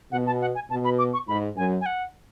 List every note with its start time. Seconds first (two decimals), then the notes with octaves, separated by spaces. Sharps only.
0.12 B2 F#5
0.27 A5
0.41 F#5
0.55 G#5
0.70 B2 A5
0.85 B5
0.98 D6
1.13 C#6
1.28 G#2 B5
1.56 F#2 G#5
1.81 G#5
1.86 F#5